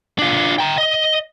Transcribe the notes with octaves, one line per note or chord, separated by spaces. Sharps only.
D4 F4
G5 A#5
D#5